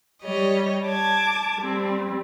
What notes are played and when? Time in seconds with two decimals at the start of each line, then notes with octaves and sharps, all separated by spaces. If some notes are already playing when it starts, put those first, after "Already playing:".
0.22 G3 G4 C#5 D#5
0.87 A5 D6 G#6
1.59 G3 C4